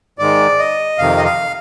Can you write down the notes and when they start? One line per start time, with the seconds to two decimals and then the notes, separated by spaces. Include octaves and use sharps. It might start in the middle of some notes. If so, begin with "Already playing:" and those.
0.19 G#2 D#3 G#3 D5
0.59 D#5
0.98 F2 C3 D#3 F5
1.17 D#5
1.24 F5